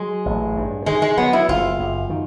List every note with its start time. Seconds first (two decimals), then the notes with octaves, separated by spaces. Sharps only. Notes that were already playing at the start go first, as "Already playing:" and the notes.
Already playing: F#3 G#3
0.26 A1
0.57 G2
0.86 D#3 G#3
1.02 G#3
1.18 F#3 B3
1.33 E4
1.48 F#1 F4
1.80 F#2
2.10 D#3